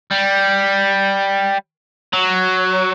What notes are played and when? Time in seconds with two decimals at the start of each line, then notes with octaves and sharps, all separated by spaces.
0.11 G3
2.13 F#3